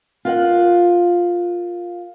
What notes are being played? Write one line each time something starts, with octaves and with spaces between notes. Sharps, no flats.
F4 A#4 F#5